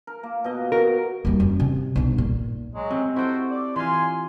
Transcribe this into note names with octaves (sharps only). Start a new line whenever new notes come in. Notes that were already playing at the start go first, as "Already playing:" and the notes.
A#4
A#3
B2 D#5
F#4 A#4
D#2 G3
F#2
C3
B1 G2
A#2
F#3 G#3
C3
E4 F#4 A4 C5 G5
D5
E3 F4 G#5 C6